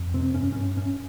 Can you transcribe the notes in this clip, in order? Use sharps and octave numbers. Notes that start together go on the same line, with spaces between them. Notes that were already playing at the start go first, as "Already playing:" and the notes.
Already playing: F2
C3 C4
G2 C#4
G2 C#4
G2 C#4